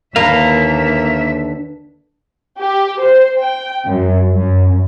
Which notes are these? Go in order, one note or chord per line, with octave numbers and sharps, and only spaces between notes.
D#2 D3 A#3 B4 E5 F5 A#5
G4
C5
G5
F#2
F#2